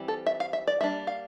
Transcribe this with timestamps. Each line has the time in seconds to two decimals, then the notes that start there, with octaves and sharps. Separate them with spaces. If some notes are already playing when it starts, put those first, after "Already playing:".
Already playing: E3 G3 C4
0.08 A4
0.26 E5
0.40 F5
0.53 E5
0.67 D5
0.81 G3 A#3 D4 E5
1.07 F5